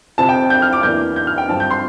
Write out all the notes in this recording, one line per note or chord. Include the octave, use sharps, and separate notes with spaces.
F2 C3 F3 C4 A5
G5
G6
F6
D6
E2 E3 A#3 D4 G6
G6
F6
G5
G2 F3 C4 A5
G6
C6